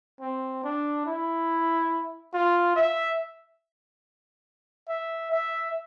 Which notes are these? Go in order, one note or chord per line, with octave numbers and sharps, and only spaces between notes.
C4
D4
E4
F4
E5
E5
E5